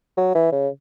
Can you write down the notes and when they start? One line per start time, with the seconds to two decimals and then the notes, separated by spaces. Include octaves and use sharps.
0.17 F#3
0.35 E3
0.52 C#3